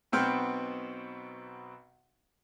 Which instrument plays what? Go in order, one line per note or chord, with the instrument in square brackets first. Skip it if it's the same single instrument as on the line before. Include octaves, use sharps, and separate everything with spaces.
[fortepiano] B1 B2 B3 C4 G5 F6